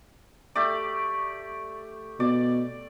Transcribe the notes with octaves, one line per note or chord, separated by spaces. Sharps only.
A3 G4 D5
B2 D5